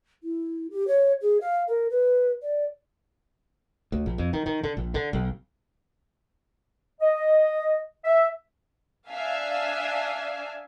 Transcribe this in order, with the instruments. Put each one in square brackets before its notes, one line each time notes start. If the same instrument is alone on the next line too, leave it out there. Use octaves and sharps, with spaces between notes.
[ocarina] E4
G4
C#5
G#4
F5
A#4
B4
D5
[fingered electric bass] D2
A#1
F2
D#3
D#3
D3
A#1
D3
B1
[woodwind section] D#5
E5
[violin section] D4 E5 F5 G#5